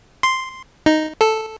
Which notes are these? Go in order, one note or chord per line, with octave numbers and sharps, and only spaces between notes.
C6
D#4
A4